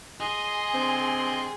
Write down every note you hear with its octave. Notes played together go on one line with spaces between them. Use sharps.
G#4 D#5 C6
D3 G3 C4